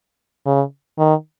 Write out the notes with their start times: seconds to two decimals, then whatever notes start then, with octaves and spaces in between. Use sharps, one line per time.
0.46 C#3
0.98 D#3